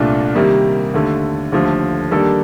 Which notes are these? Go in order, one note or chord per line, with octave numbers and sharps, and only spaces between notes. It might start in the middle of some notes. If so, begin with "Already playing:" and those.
Already playing: C2 A#2 A3 D4 F4
C3 D#3 G3 A#3
D#2 D3 A3
D#2 D3 F3 A3
D#3 G3 A#3 D4 A4